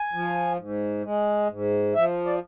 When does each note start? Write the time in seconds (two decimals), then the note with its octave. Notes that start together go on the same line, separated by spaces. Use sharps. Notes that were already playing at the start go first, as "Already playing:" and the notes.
Already playing: G#5
0.13 F3
0.59 G#2
1.04 G#3
1.50 G#2
1.95 F3 E5
2.26 D5